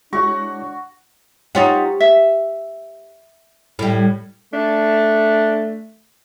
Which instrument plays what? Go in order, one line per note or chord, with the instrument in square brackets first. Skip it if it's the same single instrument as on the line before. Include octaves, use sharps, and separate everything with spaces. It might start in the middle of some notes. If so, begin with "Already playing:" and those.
[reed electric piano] G#3 E4 C#5 [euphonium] D4 [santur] F#4 [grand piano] C#6
[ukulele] D#4 F4 F#5 [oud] G4 C#5
[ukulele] E5
[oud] A2 G3
[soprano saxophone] A3 [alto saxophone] D4